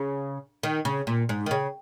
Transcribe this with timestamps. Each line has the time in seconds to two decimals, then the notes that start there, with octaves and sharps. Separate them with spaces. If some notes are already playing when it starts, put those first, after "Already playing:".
Already playing: C#3
0.63 D#3
0.85 C#3
1.07 A#2
1.29 G#2
1.46 D#3
1.51 C#3